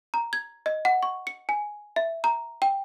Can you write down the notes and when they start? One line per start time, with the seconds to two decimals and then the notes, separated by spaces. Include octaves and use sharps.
0.14 A#5
0.33 G#6
0.66 D#5
0.85 F#5
1.03 C#6
1.27 C#7
1.49 G#5
1.96 E5
2.24 A#5
2.62 G5